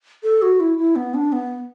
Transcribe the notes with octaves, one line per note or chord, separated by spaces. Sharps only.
A4
F#4
E4
E4
B3
D4
B3